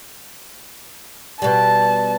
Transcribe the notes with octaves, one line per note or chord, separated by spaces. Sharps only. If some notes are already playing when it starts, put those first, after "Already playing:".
B2 G3 A5